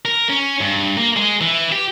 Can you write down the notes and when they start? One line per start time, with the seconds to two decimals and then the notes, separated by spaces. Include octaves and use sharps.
0.05 A#4
0.29 C#4
0.61 G2
0.97 A#3
1.16 G#3
1.41 E3
1.72 G4